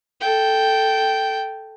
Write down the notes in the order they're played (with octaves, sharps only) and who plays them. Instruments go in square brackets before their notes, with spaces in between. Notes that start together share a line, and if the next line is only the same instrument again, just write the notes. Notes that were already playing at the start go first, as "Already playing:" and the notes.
[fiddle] A4 G5